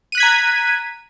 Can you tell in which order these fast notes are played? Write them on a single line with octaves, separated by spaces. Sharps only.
D#7 F#6 B6 G#6 A#5